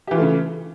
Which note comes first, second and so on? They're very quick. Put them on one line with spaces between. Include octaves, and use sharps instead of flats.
G4 E3 F4 A3 C#3